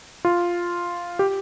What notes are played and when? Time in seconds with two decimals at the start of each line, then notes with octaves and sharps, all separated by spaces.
0.25 F4
1.19 G4